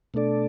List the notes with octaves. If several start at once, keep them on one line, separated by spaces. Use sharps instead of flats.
B2 A3 D4 A4 D5